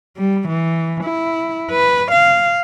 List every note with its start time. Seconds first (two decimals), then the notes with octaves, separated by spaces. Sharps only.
0.17 G3
0.48 E3
1.04 E4
1.71 B4
2.12 F5